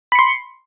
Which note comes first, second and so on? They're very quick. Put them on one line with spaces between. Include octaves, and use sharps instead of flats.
B5 C#7 C6